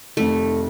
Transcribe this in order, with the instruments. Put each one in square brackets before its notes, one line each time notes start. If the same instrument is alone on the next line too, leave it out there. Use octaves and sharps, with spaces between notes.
[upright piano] F1 F2 D#3 [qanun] A3